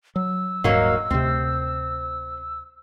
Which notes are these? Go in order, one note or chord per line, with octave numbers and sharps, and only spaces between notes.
F#3 E6
D#1 G#2 F#3 A#3 D#4
D2 C3 C4